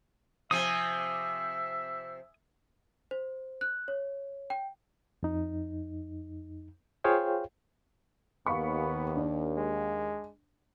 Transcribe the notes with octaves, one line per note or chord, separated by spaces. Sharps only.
C3 F3 C4 E5 G#5 D#6
C5
F#6
C#5
G5
F2 D#4
F4 G#4 C5 C#5 F5 G5
D#2 B3 F5 B5 C#6
D4
G#3